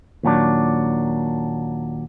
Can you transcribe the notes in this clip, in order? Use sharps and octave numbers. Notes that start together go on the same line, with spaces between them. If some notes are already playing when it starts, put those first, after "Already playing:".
D#2 A#2 F#3 D4